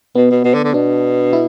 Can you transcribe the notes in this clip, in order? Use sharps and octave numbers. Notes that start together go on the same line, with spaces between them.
B2 B3
B2
B2
D3
D3
B2 D4
E4